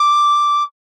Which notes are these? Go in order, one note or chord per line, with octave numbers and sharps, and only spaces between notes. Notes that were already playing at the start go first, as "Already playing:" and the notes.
Already playing: D6